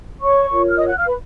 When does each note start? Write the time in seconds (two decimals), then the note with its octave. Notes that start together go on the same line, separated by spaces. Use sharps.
0.21 C#5 C#6
0.49 F4 A#4 C#5
0.68 F6
0.78 D#5 D#6
0.87 F#5 F#6
0.97 F5 F6
1.06 B4 B5